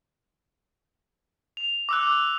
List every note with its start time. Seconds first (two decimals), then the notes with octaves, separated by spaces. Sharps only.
1.57 F7
1.89 D6 E6 F#6